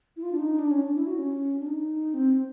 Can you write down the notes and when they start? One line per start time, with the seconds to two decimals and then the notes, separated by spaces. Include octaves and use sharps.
0.17 E4
0.23 F4
0.32 D4
0.39 D#4
0.59 D4
0.71 C#4
0.82 D4
0.95 E4
1.07 F#4
1.18 C#4
1.60 D4
1.67 D#4
2.14 C4